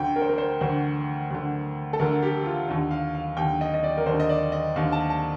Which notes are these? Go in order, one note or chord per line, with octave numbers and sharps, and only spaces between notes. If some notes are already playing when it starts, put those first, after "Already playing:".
Already playing: D2 D3 G5
A#4
C5
A#4
C5
D2 D3 C5
D2 D3
A4
D2 D3 A#4
G4
F4
D#2 D3
F5
F5
D#2 D3 G5
D#5
D#5
D5
A#4
D#2 D3 C5
D#5
D5
D#5
D#2 D3 F5
A5
A5